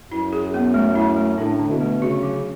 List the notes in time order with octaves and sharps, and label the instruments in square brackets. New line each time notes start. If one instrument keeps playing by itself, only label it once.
[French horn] F#2 [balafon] E4
[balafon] G#4
B3
A3
E4
A3
[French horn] A2 [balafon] D4
[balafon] D3
[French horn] B2
[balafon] A3
[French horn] C#3 [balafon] F#4
[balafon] F#3